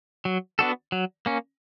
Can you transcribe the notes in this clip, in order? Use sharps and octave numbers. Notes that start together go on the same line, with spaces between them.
F#3
B3 D4 F#4 A4
F#3
A#3 C#4